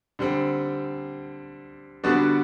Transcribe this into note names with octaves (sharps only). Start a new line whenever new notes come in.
D3 G3 C4
D3 G3 B3 D4 F#4